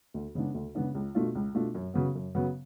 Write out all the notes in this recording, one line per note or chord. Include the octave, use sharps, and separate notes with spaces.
D2
C#3 G#3 B3 D4
D2
C#3 G#3 B3 D4
C#2
B2 A3 D4 F4
C#2
B2 A3 D4 F4
F#2
C#3 F#3 B3
F#2
C#3 F#3 B3